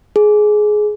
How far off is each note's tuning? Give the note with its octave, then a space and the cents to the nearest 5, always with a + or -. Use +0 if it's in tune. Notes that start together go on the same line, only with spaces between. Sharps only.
G#4 +15